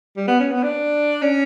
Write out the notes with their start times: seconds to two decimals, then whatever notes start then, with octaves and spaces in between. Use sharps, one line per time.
0.16 G3
0.28 B3
0.40 C#4
0.52 B3
0.64 D4
1.22 C#4